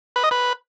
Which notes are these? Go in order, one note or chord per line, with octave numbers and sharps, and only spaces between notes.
B4
D#5
B4